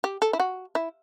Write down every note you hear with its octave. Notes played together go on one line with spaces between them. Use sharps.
G4
A4
E4
F#4
E4